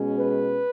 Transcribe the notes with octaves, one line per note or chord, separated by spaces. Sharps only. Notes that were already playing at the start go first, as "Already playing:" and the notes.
Already playing: B2 G#3 C#4
B4